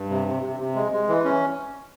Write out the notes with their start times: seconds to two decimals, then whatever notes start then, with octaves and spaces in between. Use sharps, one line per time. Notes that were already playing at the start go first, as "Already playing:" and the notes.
Already playing: G2
0.10 C3
0.27 C3
0.42 C3
0.60 C3
0.75 G#3
0.92 G#3
1.09 E3
1.24 C#4